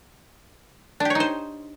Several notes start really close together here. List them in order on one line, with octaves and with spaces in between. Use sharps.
D4 G4 C#5 D#4 C5